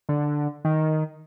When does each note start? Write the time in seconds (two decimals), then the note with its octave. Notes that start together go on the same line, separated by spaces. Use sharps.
0.09 D3
0.65 D#3